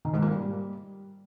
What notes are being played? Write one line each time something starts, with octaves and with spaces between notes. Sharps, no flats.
D#3
G#2
A#3
G3